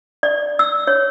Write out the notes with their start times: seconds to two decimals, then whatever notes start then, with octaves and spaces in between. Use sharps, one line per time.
0.23 D5
0.59 E6
0.87 C#5